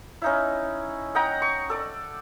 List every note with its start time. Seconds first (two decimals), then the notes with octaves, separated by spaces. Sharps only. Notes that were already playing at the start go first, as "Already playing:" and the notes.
0.22 C#4 D#4 E4
1.15 D#5 F#5 G5 A#5
1.42 C#6
1.70 A4 D5